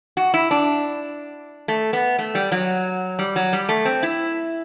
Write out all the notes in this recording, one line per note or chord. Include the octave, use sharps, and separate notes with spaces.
F#4
E4
D4
A3
B3
A3
G3
F#3
G3
F#3
G3
A3
C4
E4